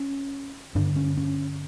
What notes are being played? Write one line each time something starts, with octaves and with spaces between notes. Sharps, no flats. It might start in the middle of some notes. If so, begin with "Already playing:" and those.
Already playing: C#4
G2 D3 D4
C#4
C#4